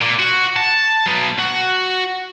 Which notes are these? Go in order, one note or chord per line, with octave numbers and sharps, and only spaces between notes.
A#2
F#4
A5
F#3 B3
F#4